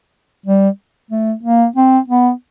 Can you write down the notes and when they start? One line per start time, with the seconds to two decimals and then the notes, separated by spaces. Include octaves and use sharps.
0.46 G3
1.11 A3
1.43 A#3
1.76 C4
2.08 B3